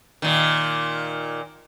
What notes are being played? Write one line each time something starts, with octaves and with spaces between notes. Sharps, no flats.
A#2 D#3